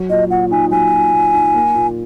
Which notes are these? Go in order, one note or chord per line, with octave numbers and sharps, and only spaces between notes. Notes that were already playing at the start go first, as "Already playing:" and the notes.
Already playing: F#3
A#2 D#5
A#2 F#5
D#4 G#5
F#3 G#5
A#2
A#2
D#4
A#3
A#2